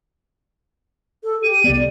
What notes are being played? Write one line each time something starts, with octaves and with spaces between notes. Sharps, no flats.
A4
G4 D#7
C2 B3 D5